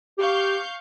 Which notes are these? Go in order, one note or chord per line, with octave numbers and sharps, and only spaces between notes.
G4 F5 C#6 G6